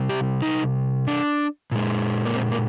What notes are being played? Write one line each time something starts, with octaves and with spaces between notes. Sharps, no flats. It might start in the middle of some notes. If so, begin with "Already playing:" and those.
Already playing: C3 G3
G4
D#4
D4
A#2 G#3
A#3
C4
A#3